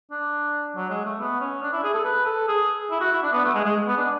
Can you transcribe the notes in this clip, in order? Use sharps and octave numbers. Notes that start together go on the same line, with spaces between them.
D4
F#3
G#3
A3
B3
C#4
D4
E4
G#4
A4
B4
A4
G#4
E4
F#4
E4
D4
B3
A3
G#3
G#3
B3
D4